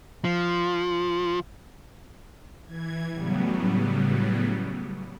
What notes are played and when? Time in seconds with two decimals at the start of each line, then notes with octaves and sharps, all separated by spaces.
0.24 F3
2.67 E3 G#6
3.12 A2 C#3 F#3 G3 B3